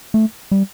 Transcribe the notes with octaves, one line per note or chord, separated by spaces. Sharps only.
A3
G3